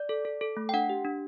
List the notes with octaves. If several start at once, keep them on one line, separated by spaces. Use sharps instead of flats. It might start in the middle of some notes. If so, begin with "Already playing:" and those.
Already playing: D5
A4
A4
A4
A3
G5
D4 F#5
G4
D4